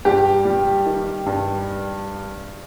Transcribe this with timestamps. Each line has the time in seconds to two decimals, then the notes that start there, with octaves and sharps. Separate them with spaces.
0.05 G2 G4
0.45 G3
0.86 D#3
1.26 G2